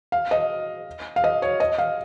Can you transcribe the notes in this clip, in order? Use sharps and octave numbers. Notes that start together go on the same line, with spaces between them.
F5
D#5
F5
D#5
C#5
D#5
F5